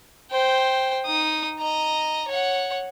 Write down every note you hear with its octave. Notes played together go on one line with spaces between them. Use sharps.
C5 G5
D#4 D#6
D#5 A#5
C#5 F#5